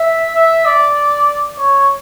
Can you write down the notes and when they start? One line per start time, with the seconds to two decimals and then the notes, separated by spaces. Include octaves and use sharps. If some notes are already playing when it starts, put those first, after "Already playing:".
Already playing: E5
0.34 E5
0.65 D5
1.58 C#5